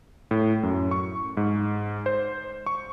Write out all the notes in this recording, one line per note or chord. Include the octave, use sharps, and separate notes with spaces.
A2
F#2
C#6
G#2
C5
C#6